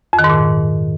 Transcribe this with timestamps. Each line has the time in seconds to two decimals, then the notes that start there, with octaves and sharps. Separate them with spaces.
0.13 F2
0.19 D#3
0.24 G#2
0.30 A#2